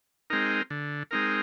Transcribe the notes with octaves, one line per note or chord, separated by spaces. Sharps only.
G#3 C4 D#4 A#4
D3
G#3 C4 D#4 A#4